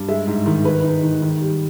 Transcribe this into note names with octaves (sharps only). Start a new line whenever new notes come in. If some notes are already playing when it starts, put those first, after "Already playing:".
Already playing: G2
G#3 E5
G#2
D#3
G#3 B4
D#4
D#3
D#3
G3